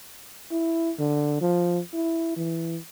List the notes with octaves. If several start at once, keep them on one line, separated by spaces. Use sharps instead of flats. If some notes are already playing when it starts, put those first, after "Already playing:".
E4
D3
F3
E4
E3